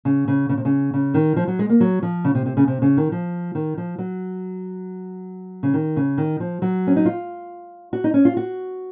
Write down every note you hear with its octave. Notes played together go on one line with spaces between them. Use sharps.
C#3
C#3
C#3
C3
C#3
C#3
D#3
F3
F#3
G#3
A#3
F#3
F3
C#3
C3
C3
C#3
C3
C#3
D#3
F3
D#3
F3
F#3
C#3
D#3
C#3
D#3
F3
F#3
C#4
D#4
F4
F#4
D#4
C#4
F4
F#4